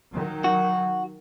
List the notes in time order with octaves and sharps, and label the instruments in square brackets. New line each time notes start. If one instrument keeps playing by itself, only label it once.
[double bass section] D#3 F#3
[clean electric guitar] F#4